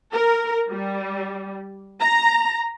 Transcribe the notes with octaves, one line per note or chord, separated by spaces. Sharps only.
A#4
G3
A#5